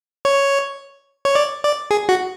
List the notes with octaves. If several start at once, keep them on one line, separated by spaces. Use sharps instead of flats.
C#5
C#5
D5
D5
G#4
F#4